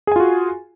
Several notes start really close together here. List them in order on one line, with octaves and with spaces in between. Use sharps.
G#4 G#5 F4 F#4